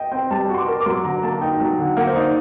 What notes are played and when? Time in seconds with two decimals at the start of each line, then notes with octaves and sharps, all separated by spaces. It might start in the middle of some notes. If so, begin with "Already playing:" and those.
Already playing: D#5 G5
0.12 C4 G5
0.30 G3 A5
0.49 F#4
0.54 C6
0.58 D6
0.68 A#4
0.80 D6
0.86 F#3 C6
1.04 D3 A#5
1.23 A#3 A5
1.41 D#4 G5
1.60 F#3
1.79 D3
1.97 A#3 F#5
2.07 C5
2.15 D#4 D5